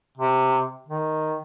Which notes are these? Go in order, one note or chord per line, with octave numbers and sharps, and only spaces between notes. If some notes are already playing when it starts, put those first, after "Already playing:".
C3
D#3